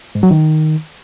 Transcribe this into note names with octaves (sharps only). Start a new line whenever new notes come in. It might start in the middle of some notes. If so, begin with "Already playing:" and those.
G#2
F#3
D#3